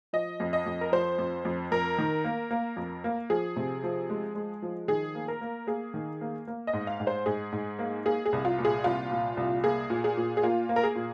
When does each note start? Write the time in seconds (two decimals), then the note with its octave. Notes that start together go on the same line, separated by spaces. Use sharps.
0.13 F3 D#5
0.40 F2
0.53 D#5
0.66 F2
0.81 A#4
0.92 F3 C5
1.18 F2
1.45 F2
1.71 F2 A#4
1.99 D#3
2.24 A#3
2.51 A#3
2.77 F2
3.04 A#3
3.30 F3 G#4
3.56 C3
3.83 F3
4.10 G#3
4.35 G#3
4.62 F3
4.88 D#3 G#4
5.15 A#3
5.28 A#4
5.41 A#3
5.67 A#3 G#4
5.94 D#3
6.21 A#3
6.47 A#3
6.67 D#5
6.73 G#2
6.87 F5
7.00 G#2
7.07 C5
7.26 G#2 G#4
7.52 G#2
7.79 A#3
8.05 A#3 G#4
8.26 G#4
8.33 C2
8.45 F4
8.58 A#2
8.65 G#4
8.84 C2 F4
9.11 A#2
9.37 C2
9.63 A#3 G#4
9.90 A#2
10.04 G#4
10.17 A#2
10.37 G#4
10.43 A#3 F4
10.69 A#3
10.76 A#4
10.83 G#4
10.95 A#2